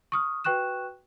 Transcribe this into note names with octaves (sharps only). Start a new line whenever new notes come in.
C#6 D#6 F6
F#4 B4 G5 C#6 F#6 E7